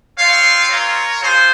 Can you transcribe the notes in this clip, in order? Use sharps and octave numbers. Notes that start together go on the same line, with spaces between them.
C4 F4 C#5 F5
A#4 C#5
F4 G#4 C5